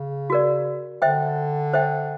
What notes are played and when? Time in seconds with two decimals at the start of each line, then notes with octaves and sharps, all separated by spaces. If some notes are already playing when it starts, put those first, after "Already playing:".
Already playing: C#3
0.30 F#4 A#4 D5
1.02 D3 C5 E5 G5
1.73 C5 E5 G5